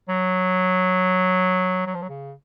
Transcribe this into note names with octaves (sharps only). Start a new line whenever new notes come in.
F#3
F#3
F3
F#3
C#3